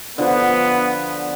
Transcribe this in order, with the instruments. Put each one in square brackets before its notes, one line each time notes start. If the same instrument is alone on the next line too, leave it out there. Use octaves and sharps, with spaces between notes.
[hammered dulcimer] D3 F3 [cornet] B3